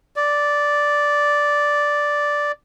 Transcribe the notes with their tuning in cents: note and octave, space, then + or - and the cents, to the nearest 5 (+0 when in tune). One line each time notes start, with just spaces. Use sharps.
D5 -5